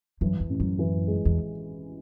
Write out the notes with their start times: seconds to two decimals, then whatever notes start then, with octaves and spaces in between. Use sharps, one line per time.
0.21 F#2 E3
0.40 E2
0.50 A1
0.60 F#2
0.79 E3
1.07 G#3
1.25 E2